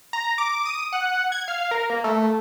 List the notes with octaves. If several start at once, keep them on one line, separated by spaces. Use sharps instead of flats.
A#5
D6
D#6
F#5
G#6
F5
A#4
A#3
A3